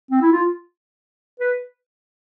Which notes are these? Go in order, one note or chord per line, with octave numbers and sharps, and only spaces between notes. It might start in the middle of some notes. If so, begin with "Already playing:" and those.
C4
E4
F4
B4